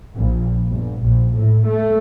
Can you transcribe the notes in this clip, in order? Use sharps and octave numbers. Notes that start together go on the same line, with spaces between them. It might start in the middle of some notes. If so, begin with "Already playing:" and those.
A#1
G1
A#1
A2
A3